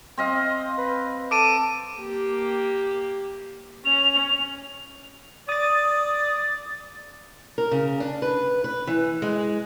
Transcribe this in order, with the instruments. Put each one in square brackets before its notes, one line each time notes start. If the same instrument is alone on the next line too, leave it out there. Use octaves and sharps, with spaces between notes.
[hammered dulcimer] C4 D#5 F5
[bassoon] B4
[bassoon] A4 [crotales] D6 D7 D#7
[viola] A#3 G4
[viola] C#4 [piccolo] F7
[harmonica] D5 [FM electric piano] D#6 A6
[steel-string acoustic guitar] A#4
C#3
D4
B4
B4
E3
G#3